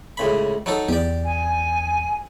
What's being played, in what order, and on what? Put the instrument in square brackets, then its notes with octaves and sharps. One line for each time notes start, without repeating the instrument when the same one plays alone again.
[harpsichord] C#2 A2 B5
F#3 D#4 A4
[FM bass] E2 [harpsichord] G4 D5
[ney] G#5